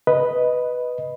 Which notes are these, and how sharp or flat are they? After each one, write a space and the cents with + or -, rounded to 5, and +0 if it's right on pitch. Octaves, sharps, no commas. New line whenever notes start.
B4 +0 D#5 +0